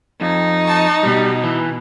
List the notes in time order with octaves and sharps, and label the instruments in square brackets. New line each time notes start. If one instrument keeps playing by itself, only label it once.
[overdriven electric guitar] F2 [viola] D#4
[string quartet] A5 C#6
[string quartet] B2 [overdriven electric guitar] G3
[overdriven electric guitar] E3